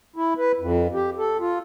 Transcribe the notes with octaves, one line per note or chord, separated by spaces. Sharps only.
E4
B4
F2
G4
A4
F4